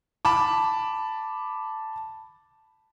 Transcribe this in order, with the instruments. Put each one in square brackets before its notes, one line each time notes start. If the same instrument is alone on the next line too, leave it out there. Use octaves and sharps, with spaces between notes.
[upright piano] A5 B5 D6